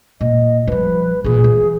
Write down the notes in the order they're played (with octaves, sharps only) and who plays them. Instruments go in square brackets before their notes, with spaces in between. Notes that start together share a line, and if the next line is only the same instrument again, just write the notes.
[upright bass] A#2 [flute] D#5
[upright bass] F3 G3 [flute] B4
[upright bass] A#2 E3 [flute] G#4
[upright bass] E3